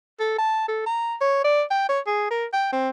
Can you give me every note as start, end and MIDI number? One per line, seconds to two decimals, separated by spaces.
0.20 0.37 69
0.38 0.67 81
0.68 0.82 69
0.86 1.15 82
1.21 1.42 73
1.44 1.63 74
1.71 1.86 79
1.89 2.00 73
2.07 2.27 68
2.31 2.46 70
2.53 2.67 79
2.72 2.90 60